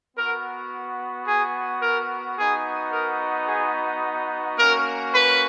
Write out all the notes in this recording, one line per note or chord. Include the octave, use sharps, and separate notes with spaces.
B3 F#4 A#4
G#4
A#4
B3 D#4 F#4 G#4
A#4
G#4
A#3 C#4 F#4 A#4
B4